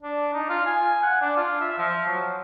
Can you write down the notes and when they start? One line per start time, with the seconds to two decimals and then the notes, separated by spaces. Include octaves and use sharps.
0.03 D4
0.33 D#4
0.49 F4
0.66 G#5
1.03 F#5
1.21 D4
1.37 F4
1.61 E5
1.78 F3
2.07 F#3